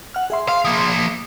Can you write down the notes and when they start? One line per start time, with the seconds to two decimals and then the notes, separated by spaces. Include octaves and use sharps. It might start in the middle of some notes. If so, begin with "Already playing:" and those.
0.14 F#5 F6
0.30 G#4 E5 C6
0.48 F5
0.65 F3 A#3